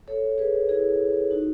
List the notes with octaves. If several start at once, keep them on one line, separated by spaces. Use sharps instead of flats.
A4 C#5
G#4 B4
E4 G#4
D#4 F#4